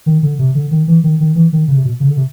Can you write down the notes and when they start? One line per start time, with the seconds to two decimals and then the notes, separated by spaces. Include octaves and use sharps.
0.06 D#3
0.23 D3
0.39 C3
0.55 D3
0.71 D#3
0.88 E3
1.04 D#3
1.20 D#3
1.35 E3
1.53 D#3
1.68 C#3
1.76 C3
1.85 B2
2.00 C#3
2.09 D3
2.17 C3